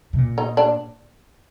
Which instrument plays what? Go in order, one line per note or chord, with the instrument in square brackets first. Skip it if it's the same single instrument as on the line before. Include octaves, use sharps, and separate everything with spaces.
[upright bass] C3
A#2
[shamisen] D#4
D4